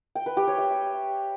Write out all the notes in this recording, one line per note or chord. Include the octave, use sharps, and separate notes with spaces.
G5
B4
G4
C#5
E5